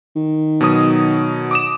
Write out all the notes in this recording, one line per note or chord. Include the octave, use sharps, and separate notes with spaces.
D#3
B2 F#3 D#6
D6 D#6 E7